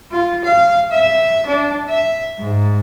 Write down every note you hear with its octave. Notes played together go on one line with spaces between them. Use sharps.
F4
F5
E5
D4
E5
G#2